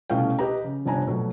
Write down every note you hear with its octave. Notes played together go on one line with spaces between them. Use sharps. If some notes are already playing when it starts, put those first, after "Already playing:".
C2 B2 A3 C#4 F5 G5
G4 B4 D#5 G5 A#5
C#3
G1 C3 D4 G#5 A#5
A#1 B2 F#3 A3